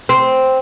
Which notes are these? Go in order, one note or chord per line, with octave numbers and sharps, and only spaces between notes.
C4